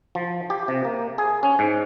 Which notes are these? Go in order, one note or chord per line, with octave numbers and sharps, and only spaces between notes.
F3
G4
C3
A#3
G#4
C#4
G#2